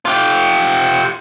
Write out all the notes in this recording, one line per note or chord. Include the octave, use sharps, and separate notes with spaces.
F4 G4